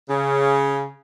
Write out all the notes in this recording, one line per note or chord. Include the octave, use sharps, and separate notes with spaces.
C#3